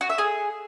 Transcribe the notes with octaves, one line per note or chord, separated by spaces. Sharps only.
F#4
E5
G#4